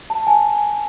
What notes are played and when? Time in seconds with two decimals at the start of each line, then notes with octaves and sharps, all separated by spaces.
0.10 A5
0.27 G#5